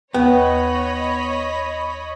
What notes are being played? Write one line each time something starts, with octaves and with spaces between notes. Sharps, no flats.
D#2 B3 C#5 D#5 B5